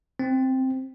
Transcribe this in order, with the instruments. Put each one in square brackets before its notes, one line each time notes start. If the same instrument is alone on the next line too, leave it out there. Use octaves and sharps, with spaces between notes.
[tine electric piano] C4